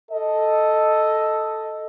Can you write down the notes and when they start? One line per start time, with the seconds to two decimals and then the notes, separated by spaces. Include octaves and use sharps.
0.10 A4 D#5